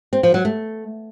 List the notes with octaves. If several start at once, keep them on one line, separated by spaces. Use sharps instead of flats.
C4
F3
F#3
A3